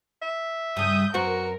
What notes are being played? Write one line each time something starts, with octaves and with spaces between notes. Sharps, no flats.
E5
G2 C#3 D#6 G6
F#2 B3 C4 F#4 A#4